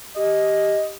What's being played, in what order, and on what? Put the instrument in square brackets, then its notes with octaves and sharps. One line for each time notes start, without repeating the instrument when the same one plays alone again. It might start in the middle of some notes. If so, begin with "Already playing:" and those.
[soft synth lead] G4 [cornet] D#5